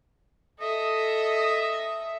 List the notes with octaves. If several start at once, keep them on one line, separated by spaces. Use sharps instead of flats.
A4 D#5 E5